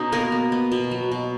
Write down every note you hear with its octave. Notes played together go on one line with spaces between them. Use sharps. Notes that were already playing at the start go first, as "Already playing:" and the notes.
Already playing: B2 C#4 D#4
A#3 B3 A#4
B3
B3
B2
F#3
B2